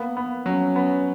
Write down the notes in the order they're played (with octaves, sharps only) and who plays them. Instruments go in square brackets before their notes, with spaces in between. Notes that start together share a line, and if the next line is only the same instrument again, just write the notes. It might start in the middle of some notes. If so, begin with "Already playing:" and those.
Already playing: [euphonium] A#3 [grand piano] B3
[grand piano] B3
[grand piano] F#3 [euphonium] C#4
[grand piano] B3